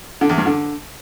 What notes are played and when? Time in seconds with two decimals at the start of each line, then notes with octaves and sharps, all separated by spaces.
0.21 D3
0.29 E2
0.38 G2
0.46 D3